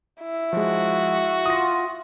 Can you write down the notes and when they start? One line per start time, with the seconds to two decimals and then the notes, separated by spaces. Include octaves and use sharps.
0.21 E4
0.53 F3 G#3 F#4
1.46 F4 F#5 D#6 A#6